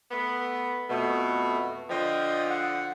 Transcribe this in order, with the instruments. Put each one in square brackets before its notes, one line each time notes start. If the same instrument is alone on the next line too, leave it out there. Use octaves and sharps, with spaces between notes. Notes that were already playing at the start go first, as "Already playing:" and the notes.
[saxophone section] A3 B3
[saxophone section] F2 B2 [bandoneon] A3 B3
[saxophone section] D3 F3 [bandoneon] D#5 G5 D#6
[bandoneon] F#5